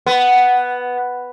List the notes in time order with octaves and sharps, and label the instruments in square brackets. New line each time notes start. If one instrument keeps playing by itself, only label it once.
[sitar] B3